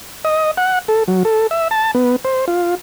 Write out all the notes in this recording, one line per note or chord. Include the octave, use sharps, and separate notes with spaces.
D#5
F#5
A4
F#3
A4
E5
A5
B3
C5
F4